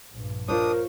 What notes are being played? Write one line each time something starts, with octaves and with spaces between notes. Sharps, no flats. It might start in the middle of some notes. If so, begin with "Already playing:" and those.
A#1 G2
D4 F4 A#4 C5 C#5 D#6